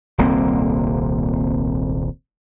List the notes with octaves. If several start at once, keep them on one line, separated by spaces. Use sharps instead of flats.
D#1 C2 A#3 C4